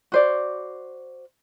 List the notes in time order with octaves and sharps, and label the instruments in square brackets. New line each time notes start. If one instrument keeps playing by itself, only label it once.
[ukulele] F#4 C5 D5